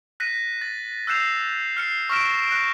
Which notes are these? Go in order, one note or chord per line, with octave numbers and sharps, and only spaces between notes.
F#6 A#6 B6 D#7
A6
E6 F#6 G6 C7 E7 F7
F6 C7 C#7
C#6 F6 A#6 B6 D7 E7
F#6 A#6